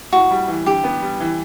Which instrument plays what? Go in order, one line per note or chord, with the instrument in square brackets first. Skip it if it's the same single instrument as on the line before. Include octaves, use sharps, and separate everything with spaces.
[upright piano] A2 [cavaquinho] F#4
[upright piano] G3
E3
[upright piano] D3 [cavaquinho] G4
[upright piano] B3
G3
E3